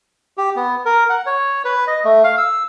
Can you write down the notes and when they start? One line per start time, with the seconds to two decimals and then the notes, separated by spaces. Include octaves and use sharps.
0.37 G4
0.56 B3
0.86 A#4
1.09 F#5
1.26 C#5
1.65 B4
1.87 D#5
2.05 A3
2.24 F5
2.38 E6